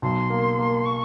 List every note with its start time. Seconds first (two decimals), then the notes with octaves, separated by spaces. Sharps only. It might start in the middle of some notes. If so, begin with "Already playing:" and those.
0.02 B1 C6
0.30 A#3
0.59 A#3
0.86 C#6